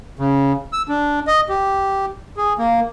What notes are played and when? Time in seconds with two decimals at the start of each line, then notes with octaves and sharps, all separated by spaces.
0.19 C#3
0.73 E6
0.89 D4
1.27 D#5
1.49 G4
2.37 G#4
2.59 A#3